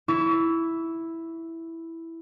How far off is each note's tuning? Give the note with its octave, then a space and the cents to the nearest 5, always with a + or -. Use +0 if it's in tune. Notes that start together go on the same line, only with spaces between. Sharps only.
E4 +0 C#6 +40